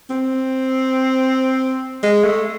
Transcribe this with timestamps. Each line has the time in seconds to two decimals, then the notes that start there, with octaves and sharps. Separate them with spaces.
0.10 C4
2.03 G#3
2.24 A3